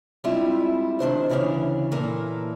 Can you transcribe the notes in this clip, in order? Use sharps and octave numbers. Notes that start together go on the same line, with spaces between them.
G3 G#3 C4 D4 E4 F4
D#3 G#3 C4 D4 E4 C5
D2 C#3 E3 C#4 D4
A#2 E3 A#3 A4